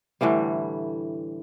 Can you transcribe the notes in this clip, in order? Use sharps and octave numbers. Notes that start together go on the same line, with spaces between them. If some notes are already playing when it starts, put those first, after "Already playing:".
A2 D3 E3 G3